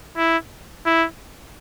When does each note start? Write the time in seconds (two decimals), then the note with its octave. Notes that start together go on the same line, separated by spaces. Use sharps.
0.17 E4
0.86 E4